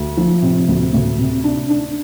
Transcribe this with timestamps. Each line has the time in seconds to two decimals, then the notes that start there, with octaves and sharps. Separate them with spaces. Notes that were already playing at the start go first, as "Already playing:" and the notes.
Already playing: D2
0.17 F3
0.42 C3
0.68 D2
0.94 D2
1.19 C3
1.44 D4
1.69 D4